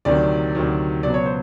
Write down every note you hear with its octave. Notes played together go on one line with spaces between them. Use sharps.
D2 C3 D#3 F#3 D4 D5
D2 C3 D#3 F#3
C#2 B2 F#3 D5
C#5
C5